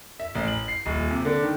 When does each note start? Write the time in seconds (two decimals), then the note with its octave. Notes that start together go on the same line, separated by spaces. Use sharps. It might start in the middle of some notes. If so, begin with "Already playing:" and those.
0.20 E5
0.35 A1
0.48 F#7
0.68 C7
0.86 D#1
1.11 C3
1.25 D3
1.42 D#3